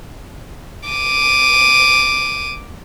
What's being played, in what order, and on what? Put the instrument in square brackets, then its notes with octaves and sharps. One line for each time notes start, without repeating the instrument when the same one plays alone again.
[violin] D6 D#7